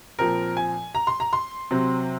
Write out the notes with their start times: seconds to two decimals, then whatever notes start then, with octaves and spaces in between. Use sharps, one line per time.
0.19 A#2 F3 C4 A#4
0.57 G#5
0.95 A#5
1.07 C6
1.20 A#5
1.33 C6
1.71 C3 F#3 C4